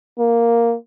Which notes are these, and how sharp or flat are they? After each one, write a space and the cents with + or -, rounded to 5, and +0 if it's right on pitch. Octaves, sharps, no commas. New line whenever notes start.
A#3 +0